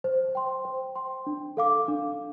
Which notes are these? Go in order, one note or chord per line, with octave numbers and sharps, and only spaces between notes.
C5
G5 C6
C5
G5 C6
D4
A4 F5 D6
D4